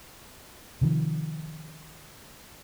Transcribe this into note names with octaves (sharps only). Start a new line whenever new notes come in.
C3 D#3 F3